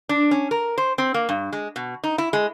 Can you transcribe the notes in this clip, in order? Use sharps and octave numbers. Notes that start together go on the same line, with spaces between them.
D4
C#4
A#4
C5
C4
A#3
G2
G#3
B2
D#4
E4
G#3